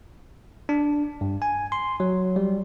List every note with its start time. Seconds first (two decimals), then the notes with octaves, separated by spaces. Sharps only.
0.69 D4
1.21 G2
1.42 G#5
1.72 C6
2.00 F#3
2.36 G3